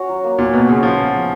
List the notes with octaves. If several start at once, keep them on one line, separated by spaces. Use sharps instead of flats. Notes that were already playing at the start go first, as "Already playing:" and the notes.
Already playing: C#4 F#4 C#5
F#3
A#3
A#2 F#3
B2 D#4
C#3 B3
F3 F4
B3
G#4